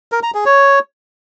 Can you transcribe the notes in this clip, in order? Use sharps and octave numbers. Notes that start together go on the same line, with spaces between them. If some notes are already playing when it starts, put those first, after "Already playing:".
A#4
A#5
G#4
C#5